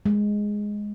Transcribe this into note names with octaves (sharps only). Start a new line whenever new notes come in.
G#3